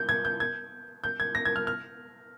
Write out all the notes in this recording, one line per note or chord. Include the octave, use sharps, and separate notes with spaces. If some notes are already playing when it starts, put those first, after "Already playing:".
Already playing: G6
G#6
G6
G#6
G6
G#6
A#6
G#6
F6
F6